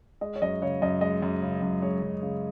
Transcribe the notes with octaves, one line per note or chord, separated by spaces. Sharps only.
G#3 D#5
C#5
F#2 D#5
C#3 C#5
F#2 D#5
G#3 D#5
F#2
C#3
F#2
G#3 C#5
F#2
C#3